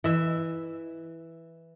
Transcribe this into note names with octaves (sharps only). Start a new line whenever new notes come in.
E3 E5